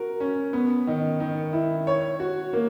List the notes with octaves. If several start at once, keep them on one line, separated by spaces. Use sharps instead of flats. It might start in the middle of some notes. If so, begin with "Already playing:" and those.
Already playing: F#4 A#4
C#4
B3
D#3
D#3
E4
C#5
F#4
A#3